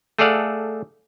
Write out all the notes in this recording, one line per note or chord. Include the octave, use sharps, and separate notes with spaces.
A3 G#4 A4 D5 F5 F#5